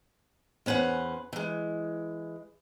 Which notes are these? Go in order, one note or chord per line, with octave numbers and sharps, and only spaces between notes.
E2 C#4 B4 C5 F#5
E3 G#3